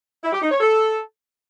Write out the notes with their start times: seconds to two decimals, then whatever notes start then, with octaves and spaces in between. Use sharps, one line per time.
0.23 E4
0.33 G4
0.42 D#4
0.51 C#5
0.61 A4